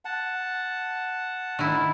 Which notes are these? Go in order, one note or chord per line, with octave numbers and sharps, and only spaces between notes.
F#5 A5
D#3 E4